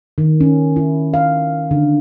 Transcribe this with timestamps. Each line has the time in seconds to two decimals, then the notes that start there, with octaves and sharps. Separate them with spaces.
0.18 D#3
0.40 C#4
0.76 E4
1.14 F5
1.71 D3